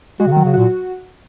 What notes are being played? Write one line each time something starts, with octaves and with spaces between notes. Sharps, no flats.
G#3 F#4
C#3
D#3
F#3
C#3
A#2 F#4